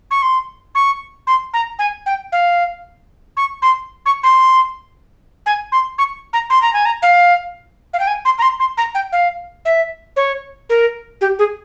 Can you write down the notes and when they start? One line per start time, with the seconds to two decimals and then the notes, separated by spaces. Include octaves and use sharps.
0.11 C#6
0.22 C6
0.75 C#6
1.27 C6
1.54 A#5
1.79 G#5
2.06 G5
2.32 F5
3.37 C#6
3.62 C6
4.06 C#6
4.23 C6
5.46 G#5
5.72 C6
5.98 C#6
6.33 A#5
6.50 C6
6.62 A#5
6.73 G#5
6.85 A#5
7.02 F5
7.94 F5
8.00 G5
8.07 G#5
8.25 C6
8.39 A#5
8.42 C6
8.60 C6
8.77 A#5
8.95 G5
9.12 F5
9.65 E5
10.16 C#5
10.70 A#4
11.21 G4
11.39 G#4